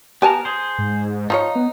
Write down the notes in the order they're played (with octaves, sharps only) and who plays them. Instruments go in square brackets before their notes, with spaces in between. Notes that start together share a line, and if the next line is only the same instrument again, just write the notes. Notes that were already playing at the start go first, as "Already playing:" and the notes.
[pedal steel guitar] B3 A#4 [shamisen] G4 G#5 A5
[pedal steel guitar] G#4 C5
[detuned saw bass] G#2
[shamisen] F3 F4 C#5 [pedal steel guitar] D#4
[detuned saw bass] B3